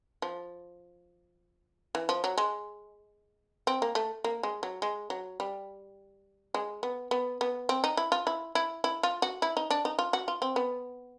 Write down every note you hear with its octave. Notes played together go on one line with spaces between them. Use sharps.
F3
E3
F3
F#3
G#3
C4
A#3
A3
A#3
G#3
F#3
G#3
F#3
G3
G#3
B3
B3
B3
C4
D#4
E4
F4
E4
E4
E4
F4
F#4
E4
D#4
D4
D#4
F4
F#4
F4
C4
B3